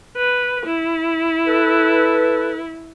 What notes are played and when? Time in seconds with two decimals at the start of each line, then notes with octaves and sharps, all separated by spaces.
0.17 B4
0.66 E4
1.47 A4 B4